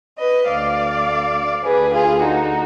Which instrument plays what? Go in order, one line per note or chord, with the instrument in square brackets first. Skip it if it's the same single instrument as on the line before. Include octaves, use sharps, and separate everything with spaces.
[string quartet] B4 D#5
D2 D3 D5 F5
D2 D3 G#4 B4
F4 G#4
D#4 F#4